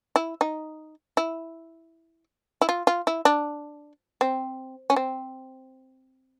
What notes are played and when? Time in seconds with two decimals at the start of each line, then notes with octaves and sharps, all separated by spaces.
0.16 E4
0.41 D#4
1.17 E4
2.61 E4
2.69 F4
2.87 F4
3.07 E4
3.25 D4
4.21 C4
4.90 C#4
4.96 C4